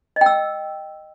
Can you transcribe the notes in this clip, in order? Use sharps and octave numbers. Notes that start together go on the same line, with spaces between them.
D#5 G5 E6